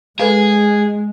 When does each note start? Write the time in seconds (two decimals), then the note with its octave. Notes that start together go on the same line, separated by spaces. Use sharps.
0.20 G#3 G#4 A4 B4 F5